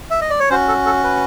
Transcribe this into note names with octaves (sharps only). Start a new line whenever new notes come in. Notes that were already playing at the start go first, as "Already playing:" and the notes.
E5
D#5
D5
C#5
C#4 F#4 C5
A4
A4
B4